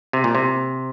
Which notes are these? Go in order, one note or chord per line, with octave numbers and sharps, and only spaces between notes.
C3
A#2
C3